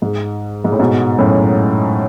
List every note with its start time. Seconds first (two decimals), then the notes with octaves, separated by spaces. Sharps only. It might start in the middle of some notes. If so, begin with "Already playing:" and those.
0.02 G#2
0.64 G#2
0.72 A2
0.79 G#2 B2
1.18 F#2 A2